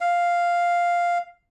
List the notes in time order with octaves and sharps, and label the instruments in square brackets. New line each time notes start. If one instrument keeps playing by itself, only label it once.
[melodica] F5